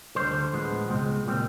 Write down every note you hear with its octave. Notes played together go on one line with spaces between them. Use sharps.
D2 D3 G3 C5
A2 F3 G#3 B3
C#2 B2 G#3 C4
A#2 G3 C4